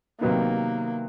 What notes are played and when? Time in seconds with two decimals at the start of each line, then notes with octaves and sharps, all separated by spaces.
0.20 C3 D#3 F#3 A#3 B3 D#4